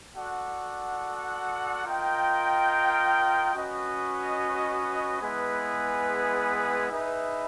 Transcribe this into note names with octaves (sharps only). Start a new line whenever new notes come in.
F#4 A4 D5 F#5
F4 A#4 D#5 G5
C#4 F#4 B4 D#5
G#3 B3 E4 G#4 B4
D#4 G#4 B4 E5